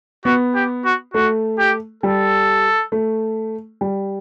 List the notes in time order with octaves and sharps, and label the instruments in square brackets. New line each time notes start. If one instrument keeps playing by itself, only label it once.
[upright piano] B3 [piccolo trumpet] F#4
[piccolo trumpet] G4
F#4
[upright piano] A3 [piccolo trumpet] F#4
[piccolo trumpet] G4
[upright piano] G3 [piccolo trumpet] A4
[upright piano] A3
G3